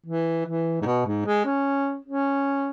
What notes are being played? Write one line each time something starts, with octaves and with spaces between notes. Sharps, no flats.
E3
E3
G#2
B2
G#2
G#3
C#4
C#4